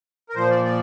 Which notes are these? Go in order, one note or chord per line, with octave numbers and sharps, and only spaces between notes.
A#4
A#2 F3 C5
D5
D5